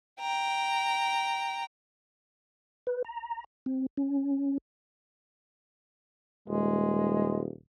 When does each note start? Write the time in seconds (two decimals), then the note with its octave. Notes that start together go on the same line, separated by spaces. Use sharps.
0.21 G5 A#5
2.87 B4
3.05 A#5
3.66 C4
3.97 C#4
6.48 D#1 G#3